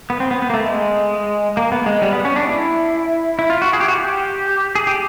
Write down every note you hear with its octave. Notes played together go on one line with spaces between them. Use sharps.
B3
C4
B3
B3
A#3
A3
G#3
A#3
B3
G#3
G3
B3
C#4
D4
E4
E4
F4
F#4
G#4
G4
F#4
G4
G#4
G4